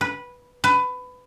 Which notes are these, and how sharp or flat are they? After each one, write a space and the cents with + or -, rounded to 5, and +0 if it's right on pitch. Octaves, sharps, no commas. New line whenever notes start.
B4 -10
B4 +20